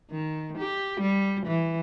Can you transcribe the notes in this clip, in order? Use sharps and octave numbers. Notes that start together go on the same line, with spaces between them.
D#3
G4
G3
E3